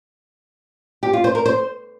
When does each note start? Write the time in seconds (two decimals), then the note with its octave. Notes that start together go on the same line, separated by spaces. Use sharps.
1.03 G4
1.13 F4
1.24 C5
1.35 A#4
1.46 C5